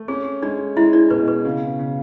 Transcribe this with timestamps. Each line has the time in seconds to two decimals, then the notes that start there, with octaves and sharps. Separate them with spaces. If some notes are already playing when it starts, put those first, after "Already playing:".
Already playing: A3
0.08 C#4 G#4
0.42 G#3 D4 D5
0.77 G#3 E4 E5
0.93 D4 D5
1.10 B2 B4
1.28 B4
1.45 C#3
1.79 C#3